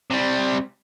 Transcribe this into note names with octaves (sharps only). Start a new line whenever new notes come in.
C3 G3